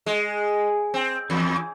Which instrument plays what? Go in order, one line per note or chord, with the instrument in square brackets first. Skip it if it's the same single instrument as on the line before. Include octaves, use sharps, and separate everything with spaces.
[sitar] G#3
C4
E2